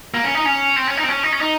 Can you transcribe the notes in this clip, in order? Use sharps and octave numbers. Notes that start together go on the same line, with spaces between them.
A#3
C#4
D#4
C#4
C4
C#4
D#4
C4
C#4
D#4
C#4
D#4